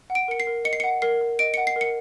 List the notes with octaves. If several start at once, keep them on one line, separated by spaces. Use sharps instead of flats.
F#5
D7
A#4 C#7
C7
A#4
D#5 C#7
C7
F#5 C#7
A#4 C7
A#4
D#5 D7
F#5 C#7
C7
A#4 C#7